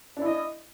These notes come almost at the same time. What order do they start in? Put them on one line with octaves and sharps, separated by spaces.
D4 E4 D#5